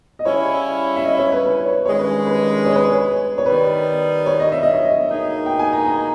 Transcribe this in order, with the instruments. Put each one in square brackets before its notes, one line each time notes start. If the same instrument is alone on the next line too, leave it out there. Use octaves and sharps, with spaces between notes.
[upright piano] D#5
[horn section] C#3 G3 C#4 E4 [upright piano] C#5
[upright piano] E5
D#5
C#5
B4
B4
C#5
[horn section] G2 D#3 G#3 C#4 [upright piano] C#5
[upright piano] B4
B4
C#5
B4
C#5
C#5
[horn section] D#3 G3 B3 [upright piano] B4
[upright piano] C#5
D#5
E5
D#5
C#5
D#5
[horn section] B2 A#3 D#4 G#4
[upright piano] G5
G#5
A#5
A#5